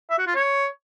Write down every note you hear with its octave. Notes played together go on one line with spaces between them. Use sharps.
E5
F#4
F4
C#5